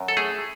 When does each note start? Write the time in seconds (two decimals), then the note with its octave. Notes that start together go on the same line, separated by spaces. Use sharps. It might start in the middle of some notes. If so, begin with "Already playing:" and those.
Already playing: F#2
0.08 A4
0.17 A3 G#4